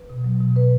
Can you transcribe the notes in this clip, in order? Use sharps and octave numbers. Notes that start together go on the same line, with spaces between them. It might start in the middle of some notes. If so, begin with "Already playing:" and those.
Already playing: B4
B2
F#3
B2
B2 B4